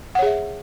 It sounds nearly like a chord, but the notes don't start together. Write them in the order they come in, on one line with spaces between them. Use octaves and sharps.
F#5 C#5 G#4 E5